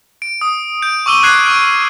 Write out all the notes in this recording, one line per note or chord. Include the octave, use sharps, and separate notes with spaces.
D7
D#6
G6 D7
C#6 D6 E6 D#7 G7
D6 F#6 G#6 C7 D7 E7
C#6 F6 D7